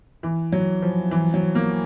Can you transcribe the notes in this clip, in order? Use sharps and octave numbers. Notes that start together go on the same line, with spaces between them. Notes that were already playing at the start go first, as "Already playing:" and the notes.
E3
F#3
F3
E3
F#3
A#3